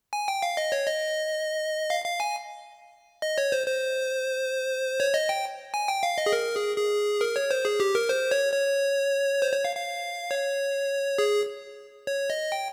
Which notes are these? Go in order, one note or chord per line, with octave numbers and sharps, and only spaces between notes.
G#5
G5
F5
D#5
C#5
D#5
F5
F5
G#5
D#5
C#5
C5
C5
C#5
D#5
G5
G#5
G5
F5
D#5
G#4
A#4
G#4
G#4
A#4
C#5
C5
G#4
G4
A#4
C5
C#5
C#5
C5
C#5
F5
F5
C#5
G#4
C#5
D#5
G5